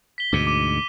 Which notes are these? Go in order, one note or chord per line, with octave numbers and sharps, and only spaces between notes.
B6 G7
D2 G#2 B2 D6 D#7
D6 D#7